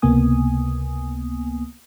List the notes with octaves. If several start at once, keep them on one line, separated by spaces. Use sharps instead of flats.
C#2 C3 A#3 B3 G#5 D#6